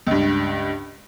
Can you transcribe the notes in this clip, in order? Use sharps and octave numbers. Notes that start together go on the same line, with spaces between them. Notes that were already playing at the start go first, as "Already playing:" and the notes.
C#2 G2